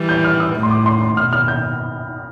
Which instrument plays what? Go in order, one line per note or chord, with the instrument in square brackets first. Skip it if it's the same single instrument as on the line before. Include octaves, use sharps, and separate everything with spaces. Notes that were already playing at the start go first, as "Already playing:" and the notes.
Already playing: [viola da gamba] E3 G3
[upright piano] G6
F6
E6
[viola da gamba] A2
[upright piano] C6
D6
C6
C6
[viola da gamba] B2 [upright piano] F6
[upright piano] F6
G6